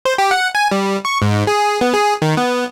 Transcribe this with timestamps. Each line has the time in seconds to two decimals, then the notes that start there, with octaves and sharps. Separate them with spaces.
0.05 C5
0.18 G4
0.31 F#5
0.55 G#5
0.71 G3
1.05 C#6
1.22 G#2
1.47 G#4
1.81 B3
1.94 G#4
2.22 D#3
2.37 B3